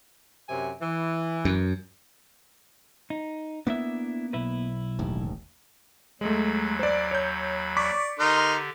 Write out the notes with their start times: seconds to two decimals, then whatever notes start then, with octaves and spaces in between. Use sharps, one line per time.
0.49 F#2 C3 G#5
0.81 E3
1.45 F#2
3.10 D#4
3.67 A#3 B3 D4 E4 E5
4.33 B1 E4 B4
4.99 E1 A1 D#2
6.21 D#2 F#3 G#3 A3 B5
6.79 C5 D5
7.11 C#5 G6
7.77 D5 C#6 D6 B6
8.19 D3 D#4 G4 A#4 C6